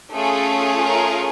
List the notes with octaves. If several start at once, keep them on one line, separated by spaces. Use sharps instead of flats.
A3 C#4 F4 G#4 A4
A#4